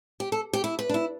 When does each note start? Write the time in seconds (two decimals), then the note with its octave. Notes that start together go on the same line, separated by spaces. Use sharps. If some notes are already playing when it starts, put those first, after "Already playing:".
0.20 G4
0.32 A4
0.53 G4
0.64 E4
0.79 B4
0.89 D4
0.94 E4